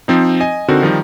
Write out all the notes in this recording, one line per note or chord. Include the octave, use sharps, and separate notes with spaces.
F3 C4 D#4
D#5 G#5
D3 C4 D#4 F#4 A#4
D#3 F3 G3 D#4